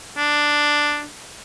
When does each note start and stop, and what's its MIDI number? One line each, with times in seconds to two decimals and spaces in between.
0.17 1.04 62